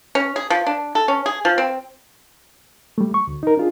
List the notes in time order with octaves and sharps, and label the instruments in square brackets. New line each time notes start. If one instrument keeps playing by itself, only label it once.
[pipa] C#4
G#4
F3
D4
A4
C#4
G#4
F3
C4
[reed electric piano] G3 A3
C#6
D2
D#4 A#4
D4 F4 G#4